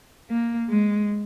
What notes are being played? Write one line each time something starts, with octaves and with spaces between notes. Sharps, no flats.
A#3
G#3